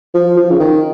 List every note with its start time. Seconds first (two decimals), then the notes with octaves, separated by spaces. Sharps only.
0.14 F3
0.37 F3
0.51 C#3
0.59 D#3